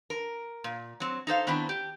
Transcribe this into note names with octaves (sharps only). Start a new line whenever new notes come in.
A#4
A#2
F#3 C4
D#4 A4 C5 F5
D#3 B3 C4 D4 E4
G4